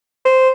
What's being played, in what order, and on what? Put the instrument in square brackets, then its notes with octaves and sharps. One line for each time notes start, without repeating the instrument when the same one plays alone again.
[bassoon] C5